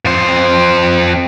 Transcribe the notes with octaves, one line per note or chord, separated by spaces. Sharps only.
F2 C5